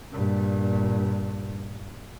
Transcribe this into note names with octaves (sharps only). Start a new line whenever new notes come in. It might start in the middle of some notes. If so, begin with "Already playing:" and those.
G2 A#2